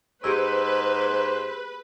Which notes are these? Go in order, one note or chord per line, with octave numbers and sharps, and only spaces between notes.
G#2 G4 G#4 B4 C5 E6